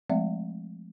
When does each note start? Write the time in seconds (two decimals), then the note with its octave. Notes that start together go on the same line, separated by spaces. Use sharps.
0.10 F3 G#3 A3 C4 D5 E5